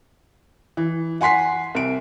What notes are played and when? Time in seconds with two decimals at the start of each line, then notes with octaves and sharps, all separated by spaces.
0.77 E3
1.21 F#5 G#5 C6 B6 C7
1.75 C2 D7